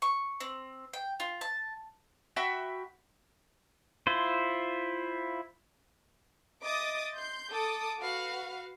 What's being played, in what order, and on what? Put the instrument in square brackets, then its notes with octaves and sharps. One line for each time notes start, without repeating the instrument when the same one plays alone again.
[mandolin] C#6
C4
G5
F4
A5
F#4 E5 G5 B5
[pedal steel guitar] E4 F4 C5
[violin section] D#5 E5 D6 D#6 A6
C6 G6
A4 D6 D#6
F#4 B4 F5